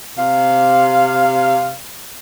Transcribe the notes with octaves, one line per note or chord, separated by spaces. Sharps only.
C3 F5